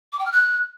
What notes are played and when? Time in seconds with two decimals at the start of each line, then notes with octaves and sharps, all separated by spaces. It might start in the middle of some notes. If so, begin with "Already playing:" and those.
0.13 D6
0.19 G5
0.26 F6
0.32 F#6